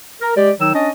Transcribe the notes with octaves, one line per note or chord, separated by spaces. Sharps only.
A#4
G#3 G4 D5
D#3 F#3 D#4 E6
C#4 D4 D#5